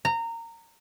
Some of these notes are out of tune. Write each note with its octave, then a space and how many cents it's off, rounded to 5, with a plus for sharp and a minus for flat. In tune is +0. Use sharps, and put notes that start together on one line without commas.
A#5 -20